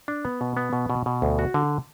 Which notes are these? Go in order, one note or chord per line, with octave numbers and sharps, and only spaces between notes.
D4
B3
B2
B3
B2
B2
B2
D2
F#4
D3